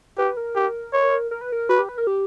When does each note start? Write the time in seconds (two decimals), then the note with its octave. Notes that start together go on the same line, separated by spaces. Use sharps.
0.18 G4 B4
0.37 A#4
0.56 G4
0.93 C#5
1.31 A#4
1.41 B4
1.52 A#4
1.69 F#4 B4
1.79 G4
1.89 B4
1.98 A#4
2.07 G4